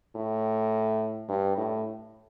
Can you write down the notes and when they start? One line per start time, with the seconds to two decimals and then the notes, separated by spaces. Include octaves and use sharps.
0.16 A2
1.29 G2
1.57 A2